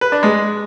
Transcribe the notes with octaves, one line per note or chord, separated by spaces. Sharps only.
B4
D4
G#3